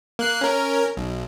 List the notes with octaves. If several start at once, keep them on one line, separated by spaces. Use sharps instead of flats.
A#3 F#6 C7
C#4 A#4
B1